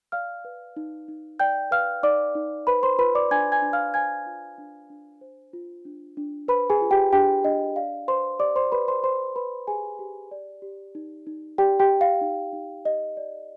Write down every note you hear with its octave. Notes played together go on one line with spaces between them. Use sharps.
D5 F5 F6
B4
D#4
D#4
D5 G5 G6
B4 F5 F6
D#4 D5 D6
D#4
B4 C5 B5
C5 C6
F4 B4 B5
D5 D6
D4 G#5 G#6
G#5 G#6
D4
F5 F6
C5 G#5 G#6
F4
D4
D4
C5
F4
D4
D4
B4 C5 B5
G#4 G#5
F4
G4 G5
D4 G4 G5
D4 D#5
D5 F5
B4 C5 C6
G4 D5 D6
C5 C6
G4 B4 B5
C5 C6
C5 D5 C6
B4 B5
G4 G#4 G#5
G4
D5
G4
D#4
D#4
G4 D5 G5
G4 G5
G4
F5
D#4
D#4
G4 D#5
D5